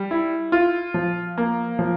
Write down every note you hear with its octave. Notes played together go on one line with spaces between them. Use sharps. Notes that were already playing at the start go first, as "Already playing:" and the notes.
Already playing: G3
E4
F4
F3
A#3
F3